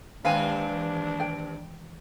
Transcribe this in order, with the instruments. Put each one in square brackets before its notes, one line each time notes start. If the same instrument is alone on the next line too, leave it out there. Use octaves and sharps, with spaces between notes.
[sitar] D#2 C4 B4 [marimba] D#3 G#3 [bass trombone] D4 [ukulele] F5 G#5
[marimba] E3
[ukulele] G5